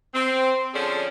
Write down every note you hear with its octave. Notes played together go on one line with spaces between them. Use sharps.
C4
D3 F3 C#4 D4 G#4 A4